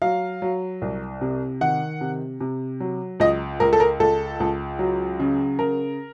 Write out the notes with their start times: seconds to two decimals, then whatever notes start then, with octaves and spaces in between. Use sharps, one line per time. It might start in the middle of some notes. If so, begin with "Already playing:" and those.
0.02 F#3 F5
0.42 F#3
0.82 C2
1.21 C3
1.61 D#3 F#5
2.01 C3
2.40 C3
2.80 F#3
3.20 C#2 D#5
3.60 C#2 A#4
3.73 A4
3.80 A#4
4.00 C#2 A4
4.40 C#2
4.79 F#3
5.20 C#3
5.59 C#3 A#4